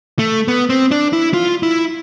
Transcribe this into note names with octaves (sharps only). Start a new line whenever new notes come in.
A3
B3
C4
D4
E4
F4
E4